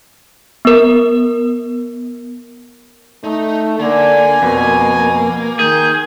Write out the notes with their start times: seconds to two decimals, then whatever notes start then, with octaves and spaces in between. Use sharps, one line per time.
0.65 B3 A#4
3.24 A3 D#4
3.80 D3 A#3 G#5
4.42 F2 B2
5.59 D#3 G#4 G6